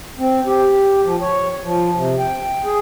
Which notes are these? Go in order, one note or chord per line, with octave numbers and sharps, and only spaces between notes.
C4
G4
F3
C#5
F3
C3
G5
G#4